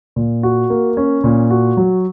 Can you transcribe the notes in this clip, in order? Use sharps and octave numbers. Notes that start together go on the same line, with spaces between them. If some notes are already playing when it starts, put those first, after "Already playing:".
A#2
F#4
A#3
C#4
A#2
F#4
F#3